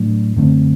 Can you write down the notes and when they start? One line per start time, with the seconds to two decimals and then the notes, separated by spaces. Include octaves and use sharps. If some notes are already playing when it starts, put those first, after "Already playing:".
Already playing: A2 F#3 A3 D4
0.36 F#2 D3 A3 C4